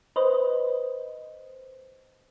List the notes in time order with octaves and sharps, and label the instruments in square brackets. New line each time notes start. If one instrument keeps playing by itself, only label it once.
[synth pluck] B4 C5 D#5